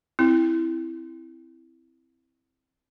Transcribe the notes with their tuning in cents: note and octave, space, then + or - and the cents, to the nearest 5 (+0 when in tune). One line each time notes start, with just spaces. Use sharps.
C4 +0 E4 +0